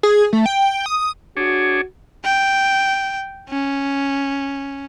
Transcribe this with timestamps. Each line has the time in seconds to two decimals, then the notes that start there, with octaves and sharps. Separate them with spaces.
0.03 G#4
0.33 A3
0.46 G5
0.86 D#6
1.37 D4 F#4 G#4 C#5
2.24 G5
3.49 C#4